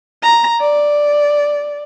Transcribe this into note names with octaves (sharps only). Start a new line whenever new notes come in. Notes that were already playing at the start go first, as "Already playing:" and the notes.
A#5
D5